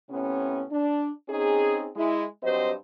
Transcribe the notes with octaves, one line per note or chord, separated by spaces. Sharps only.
A2 C3 B3 C#4
D4
C4 C#4 D#4 G#4
G#3 E4
G2 F#3 C4 G4 C5 D#5